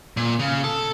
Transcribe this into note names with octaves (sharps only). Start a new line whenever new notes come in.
A#2
C#3
A4